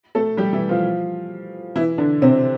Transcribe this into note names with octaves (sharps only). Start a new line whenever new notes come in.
A3 A4
G3 G4
E3 E4
F3 F4
E3 E4
D3 D4
C3 C4